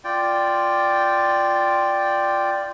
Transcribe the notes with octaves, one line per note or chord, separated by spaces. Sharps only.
F4 D5 G5